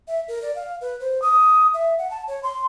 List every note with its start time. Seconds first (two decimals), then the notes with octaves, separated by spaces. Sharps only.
0.08 E5
0.28 A#4
0.42 D5
0.55 F5
0.81 B4
1.00 C5
1.22 D#6
1.74 E5
1.98 F#5
2.11 A5
2.28 C#5
2.43 C6